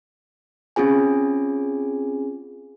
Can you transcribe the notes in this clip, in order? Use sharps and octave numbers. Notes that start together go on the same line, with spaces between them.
C4 C#4 F4 G#4 G#5